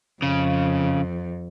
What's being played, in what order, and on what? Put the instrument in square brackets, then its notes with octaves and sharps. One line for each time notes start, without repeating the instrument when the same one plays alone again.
[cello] F2 [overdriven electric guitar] C#3